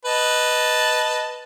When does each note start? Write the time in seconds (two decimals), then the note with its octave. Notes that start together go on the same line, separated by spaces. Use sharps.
0.05 B4 D#5 A5